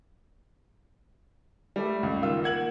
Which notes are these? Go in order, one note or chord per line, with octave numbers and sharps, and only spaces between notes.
G3 A3
C#2
D#3 F4 E6
A#3 F#5 G#6 F#7